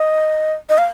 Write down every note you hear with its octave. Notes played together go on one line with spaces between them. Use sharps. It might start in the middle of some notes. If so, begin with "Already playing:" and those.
Already playing: D#5
D#5
F5